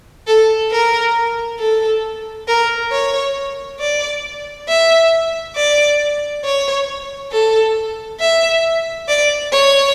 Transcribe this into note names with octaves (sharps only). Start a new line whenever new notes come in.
A4
A#4
A4
A#4
C#5
D5
E5
D5
C#5
A4
E5
D5
C#5